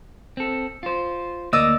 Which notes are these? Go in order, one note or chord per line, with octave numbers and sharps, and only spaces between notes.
C4 A4
F4 C5
D2 A#3 D5 D#5 E6